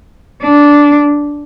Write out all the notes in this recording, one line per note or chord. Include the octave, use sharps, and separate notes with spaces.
D4